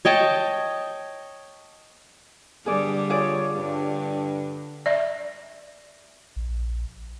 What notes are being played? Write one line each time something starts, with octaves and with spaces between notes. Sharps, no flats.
C#5 D#5 G5 A5
G2 D3 G3 G#4 D5
F4 G#4 C#5 D5
G2 D3
D5 E5
A#1